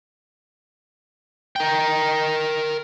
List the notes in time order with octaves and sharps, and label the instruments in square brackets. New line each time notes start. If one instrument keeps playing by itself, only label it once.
[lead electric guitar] A#4 G5